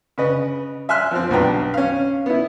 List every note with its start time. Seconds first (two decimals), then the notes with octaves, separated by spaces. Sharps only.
0.18 C#3 B4 D#5
0.89 E5 G#5 C6 F6 F#6
1.11 F3 C4
1.30 B1 G2 B2 B4 G5 A#5
1.74 C#4 F5
2.26 B3 E4